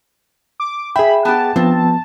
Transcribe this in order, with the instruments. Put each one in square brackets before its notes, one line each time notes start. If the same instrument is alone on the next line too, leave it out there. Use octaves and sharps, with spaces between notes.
[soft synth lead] D6
[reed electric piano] G#4 G5 [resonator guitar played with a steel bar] E5 [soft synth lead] B5
[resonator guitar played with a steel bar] B3 G4 [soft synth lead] A5
[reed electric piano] F3 B3 [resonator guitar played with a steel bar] C4